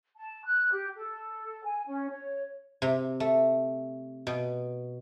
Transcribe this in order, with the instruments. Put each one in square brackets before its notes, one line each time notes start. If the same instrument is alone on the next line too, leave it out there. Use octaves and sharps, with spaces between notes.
[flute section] A5
F#6
G4
A4
G#5
C#4
C#5
[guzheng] C3
A3
B2